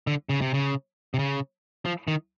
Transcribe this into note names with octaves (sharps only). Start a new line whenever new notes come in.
D3
C#3
C3
C#3
C3
C#3
F3
D#3